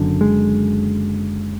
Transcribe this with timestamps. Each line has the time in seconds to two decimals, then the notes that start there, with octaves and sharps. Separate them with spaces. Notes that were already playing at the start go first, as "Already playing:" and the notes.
Already playing: F#1 F#2 D3
0.21 G#3